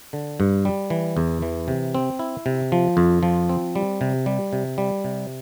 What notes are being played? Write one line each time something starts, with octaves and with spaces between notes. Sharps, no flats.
D3
G2
G3
E3
E2
E3
C3
C4
E4
C3
F3
F2
F3
C4
G3
C3
G3
C3
G3
C3